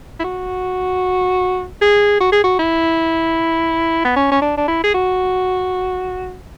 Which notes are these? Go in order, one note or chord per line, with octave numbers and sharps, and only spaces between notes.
E4
F#4
G#4
F#4
G#4
F#4
E4
B3
C#4
C#4
D4
D4
E4
G#4
F#4